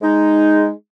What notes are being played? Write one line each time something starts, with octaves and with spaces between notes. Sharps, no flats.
G#3 D#4